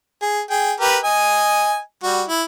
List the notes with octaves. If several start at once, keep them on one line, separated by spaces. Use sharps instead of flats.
G#4
G#4 G5
G4 A#4 B4
D#5 G#5
G3 F#4
E4